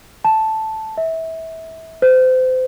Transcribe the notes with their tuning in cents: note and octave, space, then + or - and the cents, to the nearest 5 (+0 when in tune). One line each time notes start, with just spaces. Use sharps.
A5 -5
E5 -25
C5 -30